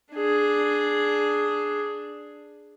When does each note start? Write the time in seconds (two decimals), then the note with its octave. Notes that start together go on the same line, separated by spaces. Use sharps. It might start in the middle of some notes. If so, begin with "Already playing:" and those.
0.13 D4 G#4